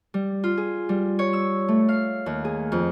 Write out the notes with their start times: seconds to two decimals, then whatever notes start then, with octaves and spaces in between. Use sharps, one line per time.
0.14 G3
0.44 F4
0.57 G#4
0.89 G3
1.19 C#5
1.33 E6
1.68 A3
1.89 F5
2.26 D#2
2.45 G#4
2.72 F2